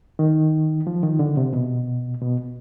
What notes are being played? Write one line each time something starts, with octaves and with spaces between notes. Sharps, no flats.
D#3
F3
D#3
D3
C3
B2
B2